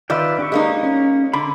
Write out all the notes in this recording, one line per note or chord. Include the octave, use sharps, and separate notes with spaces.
D#3 F4 B4 D5 E5 G5
D4 G4 C#6
G#3 A#3 D#4
C#4
D3 B5 C6 D6